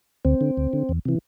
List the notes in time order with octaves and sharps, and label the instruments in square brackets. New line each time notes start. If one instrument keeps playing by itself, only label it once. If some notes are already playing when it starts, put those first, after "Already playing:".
[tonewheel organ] D2 C4
D3
D2
D3
E2
C3 E3